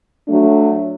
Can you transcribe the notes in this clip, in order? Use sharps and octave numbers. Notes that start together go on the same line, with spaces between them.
F#3 A3 D4